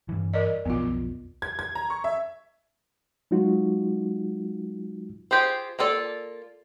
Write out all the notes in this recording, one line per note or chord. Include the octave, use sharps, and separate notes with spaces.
G2 E3
A#4 D5 D#5
B1 F2 B3 F4
G#6
G#6
A#5
C#6
E5
F#3 G#3 D#4 F4 F#4
F4 G4 G#4 C5
A#3 F4 A4 D5